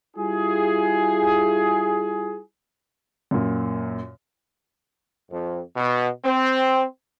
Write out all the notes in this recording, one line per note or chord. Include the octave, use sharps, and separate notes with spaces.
G3 E4 F4 G#4
F#2 A#2
F2
B2
C4